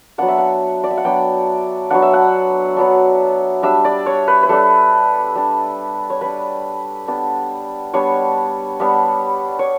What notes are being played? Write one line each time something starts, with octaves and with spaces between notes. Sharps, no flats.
F#3 B3 D4 F#5
E5
F#5
D5
E5
F#5
F#3 B3 D4 G5
F#3 B3 D4 F#5
E5
F#5
F#3 B3 D4
G3 D4 E5
D5
C#5
B4
B4
G3 D4 A4
G3 D4
C#5
G3 D4 B4
G3 B3 D4
G3 B3 D4 C#5
G3 B3 D4
C#5